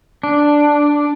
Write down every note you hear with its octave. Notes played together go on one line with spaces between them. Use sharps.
D4